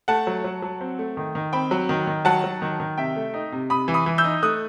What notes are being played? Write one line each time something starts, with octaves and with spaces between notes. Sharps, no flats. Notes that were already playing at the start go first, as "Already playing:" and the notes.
A3 F#5 A5
F#3
F#3
F#3
C4
A3
D#3
D#3
C4 G5 B5
F#3
D#3
D#3
F#3 F#5 A5
F#3
D#3
D#3
C3 E5 G5
A3
D#4
C3
C3 B5 D#6
E3
B5 D#6
E3
E6 G6
D#4
A3 D#6 F#6